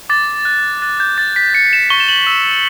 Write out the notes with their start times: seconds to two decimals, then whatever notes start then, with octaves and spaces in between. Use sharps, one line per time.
0.09 D6 A6
0.45 F#6
0.82 F#6 A6
1.00 G6
1.18 D6 A6
1.36 B6
1.54 G6 C#7
1.73 E7
1.90 C#6 G7
2.00 E7
2.08 F#7
2.27 E6